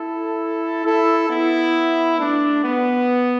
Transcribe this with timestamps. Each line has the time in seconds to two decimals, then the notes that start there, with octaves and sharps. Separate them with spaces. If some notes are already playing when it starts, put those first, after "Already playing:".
Already playing: E4 A4
0.85 E4 A4
1.30 B3 E4
2.19 A3 D4
2.64 B3